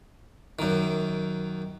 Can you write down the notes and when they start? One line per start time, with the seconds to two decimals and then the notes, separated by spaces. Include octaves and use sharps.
0.59 F#2 D#3